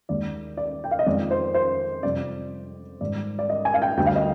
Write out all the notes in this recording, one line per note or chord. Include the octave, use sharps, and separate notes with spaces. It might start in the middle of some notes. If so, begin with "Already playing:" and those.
D#2 D#3 G#3 D5
D5
G5
F5
D#5
F2 D#3 G#3 D5
C5
C5
F2 C3 G3 D5
G#2 D#3 G3 D5
D5
D#5
G#5
F5
G5
D2 D3 G3 G5
F5
D#5